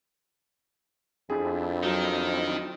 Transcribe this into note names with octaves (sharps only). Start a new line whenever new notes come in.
F2 C4 D4 E4 G#4
D#3 F#3